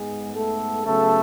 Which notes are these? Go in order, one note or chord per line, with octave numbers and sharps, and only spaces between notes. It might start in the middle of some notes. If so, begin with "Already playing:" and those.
Already playing: G#2 G#3 B3 G#4
A3 A4
C#3 F#3 A3 B3 A4